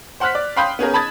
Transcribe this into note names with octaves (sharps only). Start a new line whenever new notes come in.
C5 F#5 C6 F6 F#6 B6
D5
F5 G5 B5 C6 D#6 G6
B3 C#4 G#4 A#4
A5 B5 D#6 G#6 A6